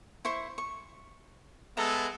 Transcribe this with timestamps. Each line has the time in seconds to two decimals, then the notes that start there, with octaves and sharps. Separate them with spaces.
0.25 E4 C5 C#6
0.58 C#6
1.77 G#3 B3 A4 E5 A#5